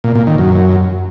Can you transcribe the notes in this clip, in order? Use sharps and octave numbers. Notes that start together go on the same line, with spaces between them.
A#2
A#2
D#3
F#2